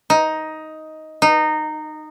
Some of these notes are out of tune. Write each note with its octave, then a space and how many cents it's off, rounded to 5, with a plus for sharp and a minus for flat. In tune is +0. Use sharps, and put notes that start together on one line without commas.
D#4 +10
D#4 -15